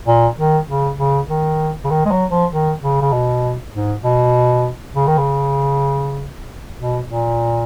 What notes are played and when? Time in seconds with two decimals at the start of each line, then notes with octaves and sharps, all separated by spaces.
0.06 A#2
0.37 D#3
0.68 C#3
0.99 C#3
1.29 D#3
1.84 C#3
1.90 D#3
2.05 G#3
2.11 F#3
2.31 F3
2.51 D#3
2.82 C#3
3.01 C#3
3.12 B2
3.74 G#2
4.04 B2
4.95 C#3
5.07 D#3
5.17 C#3
6.78 B2
7.09 A#2